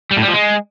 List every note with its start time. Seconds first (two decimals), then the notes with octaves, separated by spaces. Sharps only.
0.11 G3
0.16 A2
0.22 G3
0.27 F3
0.33 G#3